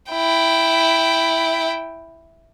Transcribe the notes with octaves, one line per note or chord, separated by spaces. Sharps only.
E4 G5